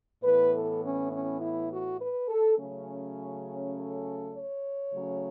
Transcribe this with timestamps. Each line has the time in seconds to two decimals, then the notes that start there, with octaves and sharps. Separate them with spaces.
0.22 A2 E3 B3 B4
0.52 A4
0.82 C#4
1.11 C#4
1.39 E4
1.70 F#4
1.99 B4
2.28 A4
2.57 C#3 F#3 A3 C#4
3.75 A4
4.34 C#5
4.92 C#3 F#3 A3 C#4